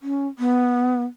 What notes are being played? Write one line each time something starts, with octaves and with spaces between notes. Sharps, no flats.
C#4
B3